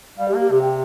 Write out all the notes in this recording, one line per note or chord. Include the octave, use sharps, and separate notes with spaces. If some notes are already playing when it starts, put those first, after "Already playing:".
G3 F5
G4
A#3
G4
C3 G4
G5